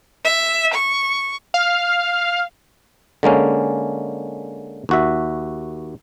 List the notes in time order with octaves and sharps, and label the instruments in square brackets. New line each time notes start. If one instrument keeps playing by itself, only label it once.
[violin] E5
C#6
[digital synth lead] F5
[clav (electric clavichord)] D3 G#3 A#3 C#4
D#2 F#4 E5